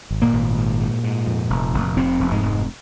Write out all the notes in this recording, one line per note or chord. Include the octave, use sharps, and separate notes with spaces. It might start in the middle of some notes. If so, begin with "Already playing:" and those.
G#1
A#2 A#3
G#1
G#2
G#2
G#2
F2
F1
F1
F1 C3 C4
F1
G#2 G#3
F1